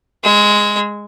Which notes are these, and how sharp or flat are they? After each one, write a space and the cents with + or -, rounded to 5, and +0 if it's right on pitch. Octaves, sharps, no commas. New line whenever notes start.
G#3 -5 D#6 +45